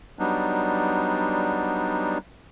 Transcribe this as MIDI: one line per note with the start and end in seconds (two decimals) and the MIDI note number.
0.19 2.18 54
0.19 2.18 55
0.19 2.18 59
0.19 2.18 62
0.19 2.18 63